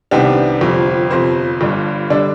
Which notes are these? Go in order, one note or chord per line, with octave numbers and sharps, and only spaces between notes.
C2 C3 D#3 B3 D4 G4
G1 F2 C3 F3
G1 F2 C3 F3 C5
G1 G2 D3 G3 D4
D3 G3 D4 D5